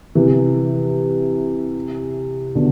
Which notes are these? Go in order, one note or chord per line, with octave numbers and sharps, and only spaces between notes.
C3 E3
B2 D3